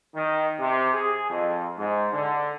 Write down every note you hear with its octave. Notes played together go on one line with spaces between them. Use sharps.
D#3
C3
G#4
F2
G#2
D3